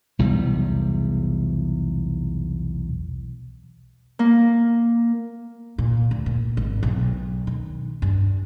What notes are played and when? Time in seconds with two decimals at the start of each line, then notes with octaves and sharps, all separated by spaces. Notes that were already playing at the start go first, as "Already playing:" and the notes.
0.19 B1 E2 C3 G3
4.19 A#3
5.78 A#2
6.11 D2
6.26 A#2
6.57 G#1
6.83 B1
7.47 D#3
8.02 G2